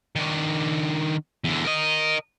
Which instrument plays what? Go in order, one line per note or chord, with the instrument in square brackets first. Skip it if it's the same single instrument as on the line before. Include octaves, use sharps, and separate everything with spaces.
[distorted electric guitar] D#3 D4
E2 D3
A#4 D#5